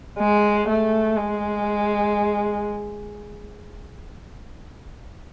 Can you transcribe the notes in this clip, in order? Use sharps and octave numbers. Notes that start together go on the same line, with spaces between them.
G#3
A3
G#3